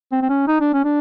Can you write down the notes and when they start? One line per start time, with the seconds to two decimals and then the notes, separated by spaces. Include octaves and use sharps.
0.12 C4
0.22 C4
0.30 C#4
0.48 D#4
0.61 D4
0.74 C#4
0.85 D4